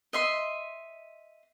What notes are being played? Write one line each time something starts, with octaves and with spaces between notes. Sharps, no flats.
D#5 E5 C6